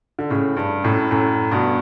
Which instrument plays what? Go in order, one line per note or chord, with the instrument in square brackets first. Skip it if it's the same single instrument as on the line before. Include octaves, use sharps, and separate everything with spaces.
[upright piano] D3
A2 C#3
G2
F#2 A2
F#2 A2
G2 B2